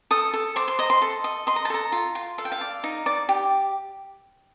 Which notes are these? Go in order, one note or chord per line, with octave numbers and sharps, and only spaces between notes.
A4 D#6
A4
C5 D6
C6
D#5 A#5
C6
A4
D#5
D#5 C6
A#5
A5
A4 A#5
F4
F4
A4 F5
G5
F5
D5
D#4
D5
G4